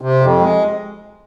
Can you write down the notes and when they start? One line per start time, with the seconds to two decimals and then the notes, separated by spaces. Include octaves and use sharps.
0.01 C3
0.20 F2
0.39 G#3